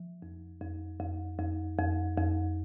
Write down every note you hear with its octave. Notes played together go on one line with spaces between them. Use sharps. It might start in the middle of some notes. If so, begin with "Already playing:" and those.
Already playing: F3
F2
F2
F2
F2
F2
F2